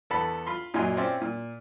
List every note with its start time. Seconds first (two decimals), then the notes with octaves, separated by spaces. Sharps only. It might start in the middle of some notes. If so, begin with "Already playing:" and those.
0.10 E2 B3 A4 B5
0.46 F4 B5 C6
0.74 F#2 A#2 F#3 D#4 G#5 C6
0.97 C4 C#4 F4 C5 D5 E5
1.21 A#2